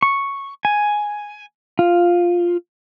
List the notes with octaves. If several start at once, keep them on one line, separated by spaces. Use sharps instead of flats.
C#6
G#5
F4